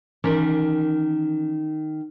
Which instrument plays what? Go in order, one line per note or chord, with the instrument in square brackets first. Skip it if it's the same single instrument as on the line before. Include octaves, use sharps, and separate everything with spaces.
[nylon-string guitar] D#3 [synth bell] E3 C#4 A#4